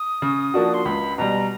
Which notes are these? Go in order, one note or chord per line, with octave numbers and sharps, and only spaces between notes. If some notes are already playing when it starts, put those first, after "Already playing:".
Already playing: D#6
C#3
F3 A#3 D4 F#4
C6
C#2 B5
B2 G3 A#5